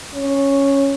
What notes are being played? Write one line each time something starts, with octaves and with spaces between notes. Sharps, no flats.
C#4